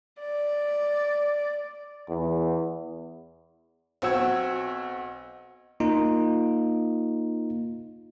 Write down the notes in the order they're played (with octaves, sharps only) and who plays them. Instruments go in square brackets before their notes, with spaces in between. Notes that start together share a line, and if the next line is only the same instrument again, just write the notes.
[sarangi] D5
[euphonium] E2
[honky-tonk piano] B1 C4 F#4 F#5 E6 G#6
[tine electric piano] A#3 D#4 F4